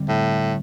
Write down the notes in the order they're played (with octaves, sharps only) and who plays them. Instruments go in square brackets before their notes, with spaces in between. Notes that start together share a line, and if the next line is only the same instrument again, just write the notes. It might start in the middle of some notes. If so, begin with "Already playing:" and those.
Already playing: [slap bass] D3 G3 C4
[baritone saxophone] A2